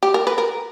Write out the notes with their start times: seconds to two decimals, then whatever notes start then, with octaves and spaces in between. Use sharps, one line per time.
0.03 G4
0.14 A#4
0.27 B4
0.38 A#4